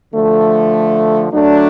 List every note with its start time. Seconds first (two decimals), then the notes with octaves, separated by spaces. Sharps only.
0.13 D3 F3 A3
1.30 F#3 A3 D4